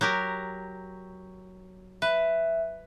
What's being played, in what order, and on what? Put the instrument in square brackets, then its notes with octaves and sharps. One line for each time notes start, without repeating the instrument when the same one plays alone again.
[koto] F#3 G4 A#4
[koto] B4 [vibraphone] E5